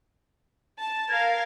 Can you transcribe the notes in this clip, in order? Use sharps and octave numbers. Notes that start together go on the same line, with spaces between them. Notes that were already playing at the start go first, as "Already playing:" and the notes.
A5
A#4 F5 G#6